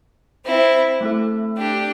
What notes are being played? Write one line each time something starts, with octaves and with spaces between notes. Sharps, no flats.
C4 E4
A3 C4 E4 A4
D4 G4